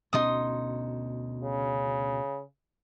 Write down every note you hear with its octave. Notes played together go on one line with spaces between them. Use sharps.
D2 B2 C#4 D#4 C6 D#6
C#3